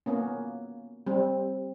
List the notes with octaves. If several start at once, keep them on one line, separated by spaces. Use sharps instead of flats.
A#3 B3 C#4
G3 C4